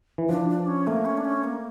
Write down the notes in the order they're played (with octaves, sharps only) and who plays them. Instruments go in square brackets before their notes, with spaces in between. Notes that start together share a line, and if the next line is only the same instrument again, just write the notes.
[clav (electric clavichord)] E3
[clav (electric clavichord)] F3 [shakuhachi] D4
[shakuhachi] D4
C#4
[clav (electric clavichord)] A3 [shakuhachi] A#3
[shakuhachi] C#4
D4
C#4
A#3